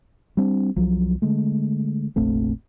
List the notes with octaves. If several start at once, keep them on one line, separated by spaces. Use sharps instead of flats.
G3 C4 D4
C2 F3 F#3
D3 G#3 A3
F1 A#1 A3 C4